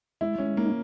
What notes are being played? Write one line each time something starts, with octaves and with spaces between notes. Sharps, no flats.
G#3 E4
G#3 C#4
A#3 D#4